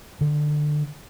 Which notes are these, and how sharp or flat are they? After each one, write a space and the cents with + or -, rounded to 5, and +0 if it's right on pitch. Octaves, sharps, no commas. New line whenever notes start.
D3 +20